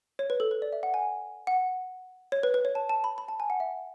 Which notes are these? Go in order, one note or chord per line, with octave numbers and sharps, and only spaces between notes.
C#5
B4
A4
B4
D5
E5
F#5
G#5
F#5
C#5
B4
B4
C#5
A5
A5
B5
B5
A5
G#5
F#5
E5